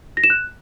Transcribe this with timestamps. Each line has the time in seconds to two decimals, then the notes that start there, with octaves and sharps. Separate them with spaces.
0.17 A#6
0.24 E7
0.30 F#6